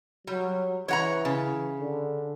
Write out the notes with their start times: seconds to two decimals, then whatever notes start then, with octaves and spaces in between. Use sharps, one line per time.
0.27 F#3 G3
0.88 E3 C#5 F#5 A#5
1.25 C#3
1.80 D3